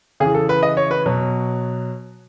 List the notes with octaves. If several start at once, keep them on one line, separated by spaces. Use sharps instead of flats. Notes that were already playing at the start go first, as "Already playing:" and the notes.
C#3 E3 G#4
A4
B4
D#5
C#5
B4
B2 F#3